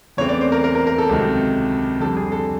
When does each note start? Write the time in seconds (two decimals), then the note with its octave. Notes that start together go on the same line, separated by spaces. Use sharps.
0.17 E2 C#3 E3 A3 C4 C#5
0.29 D5
0.41 C5
0.52 A#4
0.64 A#4
0.75 A#4
0.87 A#4
0.98 A4
1.09 C#2 C3 D#3 F#3
2.00 F2 D3 G3 C4 A4
2.17 G#4
2.32 A4